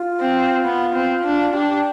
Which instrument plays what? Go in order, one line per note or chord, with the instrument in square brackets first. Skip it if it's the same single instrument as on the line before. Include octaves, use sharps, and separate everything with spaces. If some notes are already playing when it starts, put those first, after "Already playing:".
Already playing: [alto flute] F4
[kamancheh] C4
B3
C4
D4
[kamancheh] D4 [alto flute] G4